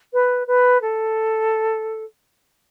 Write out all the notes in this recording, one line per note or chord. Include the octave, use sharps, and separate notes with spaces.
B4
B4
A4